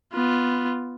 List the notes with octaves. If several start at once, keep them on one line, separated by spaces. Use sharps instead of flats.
B3 F4